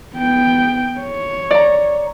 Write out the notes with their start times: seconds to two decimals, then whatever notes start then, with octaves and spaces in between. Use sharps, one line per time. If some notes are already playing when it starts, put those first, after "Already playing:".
0.15 B3 G5
1.00 C#5
1.51 D5 A#5